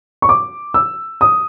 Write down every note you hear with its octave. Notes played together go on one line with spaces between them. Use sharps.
C#6
D6
E6
D#6